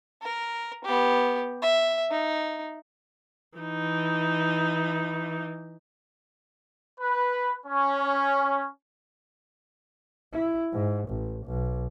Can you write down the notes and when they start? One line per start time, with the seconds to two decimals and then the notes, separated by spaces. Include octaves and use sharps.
0.22 A#4
0.85 B3 G4
1.62 E5
2.11 D#4
3.58 E3 D#4
7.00 B4
7.66 C#4
10.33 E4
10.73 G#2
11.09 A1
11.46 B1